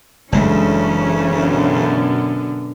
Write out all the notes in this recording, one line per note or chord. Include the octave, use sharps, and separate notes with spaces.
F#1 D2 C#3 E3 G#3 A3 C#4
F#2 B2 D3